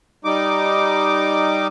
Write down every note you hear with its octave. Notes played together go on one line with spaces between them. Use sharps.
G3 D#4 D6